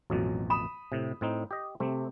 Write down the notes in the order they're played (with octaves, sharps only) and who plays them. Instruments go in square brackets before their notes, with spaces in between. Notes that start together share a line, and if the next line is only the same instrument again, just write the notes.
[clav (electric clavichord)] A1 F2 B2 [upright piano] F#3
[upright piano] B5 D#6 E7
[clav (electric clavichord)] A2 C3
A2 C4 D#4
G4 D#5
[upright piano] C3 [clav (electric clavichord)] A3 C4